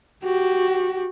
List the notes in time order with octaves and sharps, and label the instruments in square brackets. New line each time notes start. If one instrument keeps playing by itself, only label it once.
[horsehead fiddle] F#4 G4